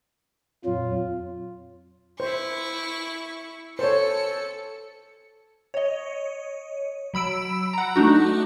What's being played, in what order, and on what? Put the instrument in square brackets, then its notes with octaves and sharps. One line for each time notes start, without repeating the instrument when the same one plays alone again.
[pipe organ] F2 A#2 F#3 [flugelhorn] F4
[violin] E4 C#6 [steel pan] C5
[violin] A4 C#7 [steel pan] C5 C#5
[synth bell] C#5 D#5
F#3 B5 E6 D7
F#5 A#5
A3 D4 D#4 F#4